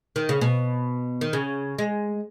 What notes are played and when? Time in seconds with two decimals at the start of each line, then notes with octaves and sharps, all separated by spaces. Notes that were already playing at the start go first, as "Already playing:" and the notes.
0.16 D#3
0.29 C#3
0.41 B2
1.21 D#3
1.33 C#3
1.79 G#3